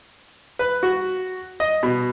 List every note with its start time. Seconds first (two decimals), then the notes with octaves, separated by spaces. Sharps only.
0.59 B4
0.83 F#4
1.60 D#5
1.83 B2